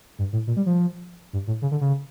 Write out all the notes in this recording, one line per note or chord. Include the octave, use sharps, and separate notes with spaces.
G2
A2
A#2
G3
F3
G2
A2
C#3
D3
C#3